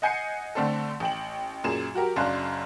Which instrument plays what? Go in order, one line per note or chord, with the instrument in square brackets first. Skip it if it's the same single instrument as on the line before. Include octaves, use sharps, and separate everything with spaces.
[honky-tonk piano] D#5 F#5 G#5 G6 C7 C#7
D3 A3 C4 D4 A4
A1 G5 F#7
F#2 A#2 G#4 E7
F#3 F#4 G4 A#4
F#1 F#2 D4 F5 C6 F#6